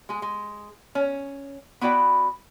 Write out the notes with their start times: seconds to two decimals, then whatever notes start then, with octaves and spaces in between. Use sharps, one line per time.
0.09 G#3 G#4
0.22 G#3
0.95 C#4
1.81 B3 E4 F#4 D5 G5